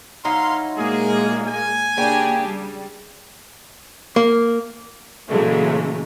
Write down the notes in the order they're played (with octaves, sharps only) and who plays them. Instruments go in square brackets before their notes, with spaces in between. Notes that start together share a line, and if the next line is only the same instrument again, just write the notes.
[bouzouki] F#3 D#4 E4 [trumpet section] F5 C6
[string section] A#2 G#3 A#3 [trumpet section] G#4
[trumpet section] G#5
[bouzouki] C#3 G5 [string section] A#3 D4 G4
[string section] G3
[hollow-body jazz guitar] A#3
[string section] A#2 C#3 E3 F#3 G#3 A3